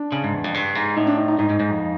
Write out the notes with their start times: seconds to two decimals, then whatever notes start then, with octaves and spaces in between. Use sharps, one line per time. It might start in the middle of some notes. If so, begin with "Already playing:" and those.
Already playing: D4
0.12 C#3
0.24 G#2
0.33 E2
0.44 F2
0.54 G2
0.75 G#2
0.96 A2 D#4
1.07 D4
1.17 D#4
1.28 D#4
1.38 G#2 D#4
1.50 G#2
1.60 G#2
1.71 F2